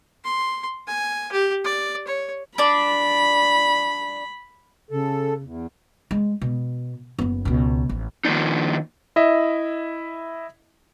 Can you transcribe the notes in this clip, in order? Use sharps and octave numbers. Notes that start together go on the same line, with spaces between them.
C6
G#5
G4
D5
C#5
D4 D5 B5
C#3 A4
E2
G#3
B2
F#1 B3
C#2 B2
A1
D#3 F3 A#3 D4 D#4
E4 D#5 E5